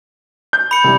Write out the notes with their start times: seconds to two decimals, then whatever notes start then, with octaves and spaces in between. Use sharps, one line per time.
0.53 G6
0.71 B5 C#7
0.84 C3 E3 G3